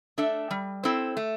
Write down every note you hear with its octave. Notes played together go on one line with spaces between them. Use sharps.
A3 D4 A4 E5
G3
C4 E4 A4 C5
A3